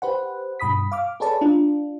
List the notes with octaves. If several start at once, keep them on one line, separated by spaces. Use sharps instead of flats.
G4 B4 C5 F#5
G2 B2 B5 D#6 B6
F5 D6 F6
G#4 A4 B4 C#5 D5 A5
D4 F4